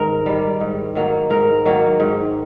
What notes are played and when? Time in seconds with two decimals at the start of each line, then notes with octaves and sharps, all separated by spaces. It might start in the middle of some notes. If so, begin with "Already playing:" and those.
Already playing: G#2 D#3 A#4
0.26 D#3 G3
0.60 G#2
0.95 D#3 F#3 A#3
1.30 G#2 A#4
1.65 D#3 F#3 A#3
2.00 G#2